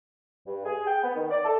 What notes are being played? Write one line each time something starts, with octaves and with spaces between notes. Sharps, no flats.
G2
G#4
G5
B3
D#3
D5
A4